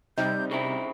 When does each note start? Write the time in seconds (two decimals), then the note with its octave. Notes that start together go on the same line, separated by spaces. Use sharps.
0.18 C3 G3 D#4 G6
0.51 C#3 C4 E4 A#5